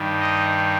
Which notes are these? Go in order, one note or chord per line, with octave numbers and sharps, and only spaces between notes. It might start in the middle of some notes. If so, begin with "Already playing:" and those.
Already playing: G2 D#3 G3
D#5